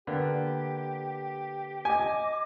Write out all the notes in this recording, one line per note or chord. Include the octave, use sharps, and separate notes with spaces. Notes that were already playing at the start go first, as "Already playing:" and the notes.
D3 A#3 B3 G4
D#5 G#5 D6